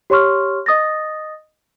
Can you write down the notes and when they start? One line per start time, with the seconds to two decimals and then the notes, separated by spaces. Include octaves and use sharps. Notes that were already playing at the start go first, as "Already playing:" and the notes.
0.10 G4 C#5 C6 C#6 F6
0.66 D#5 D#6 A6 A#6